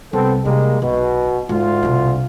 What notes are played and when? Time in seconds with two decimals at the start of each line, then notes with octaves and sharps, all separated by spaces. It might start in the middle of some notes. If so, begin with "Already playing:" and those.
0.13 C2 B3 C4 A4
0.45 C3 G3 G#3 A#3 D4
0.82 B1 B2
1.49 D2 G#2 F4
1.83 C2 B2